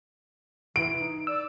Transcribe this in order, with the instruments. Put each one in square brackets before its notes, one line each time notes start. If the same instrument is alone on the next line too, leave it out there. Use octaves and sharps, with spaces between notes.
[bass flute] E3 [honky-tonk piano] D7
[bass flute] D#4
[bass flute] D5 [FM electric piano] E6